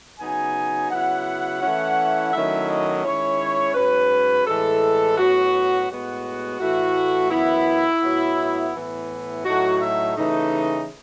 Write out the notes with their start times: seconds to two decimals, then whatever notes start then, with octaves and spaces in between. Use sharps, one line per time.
0.19 C#3 F#3 B3 D#4 G#5
0.91 C#3 F#3 B3 E4 F#5
1.62 E3 A3 C#4 E4
2.33 D#3 F#3 A3 C#4 E4 E5
2.68 D#5
3.04 D#3 G#3 C#4 E4 C#5
3.75 G#2 F#3 C#4 B4
4.46 A2 E3 G#3 A4
5.18 A2 F#3 B3 F#4
5.89 A2 G#3 B3 F#4
6.60 A2 E3 A3 E4 F#4
7.31 F#2 E3 B3 E4
8.03 A2 F#3 B3
8.74 A2 E3 B3 E4
9.45 A2 F#3 A3 D#4 F#4
9.80 E5
10.17 C#3 E3 A3 D#4